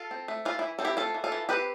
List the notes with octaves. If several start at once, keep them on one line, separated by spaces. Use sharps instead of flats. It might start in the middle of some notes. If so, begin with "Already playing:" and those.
Already playing: F4 A4
C4
A3
E3 F4
E3 E4
C4 A4
E4 G4
A3 F4 A4
E3
F4 A4
E3
C4 G4 B4